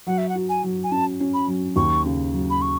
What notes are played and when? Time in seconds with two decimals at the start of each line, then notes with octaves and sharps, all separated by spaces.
0.07 F#3 F#5
0.18 E5
0.29 F#5
0.35 F#4
0.49 G#5
0.63 F#3
0.84 G#5
0.91 C#4 A5
1.20 C#4
1.34 B5
1.47 F#3
1.76 D#2 C#6
2.05 C#3
2.33 F#3
2.50 B5
2.62 C#6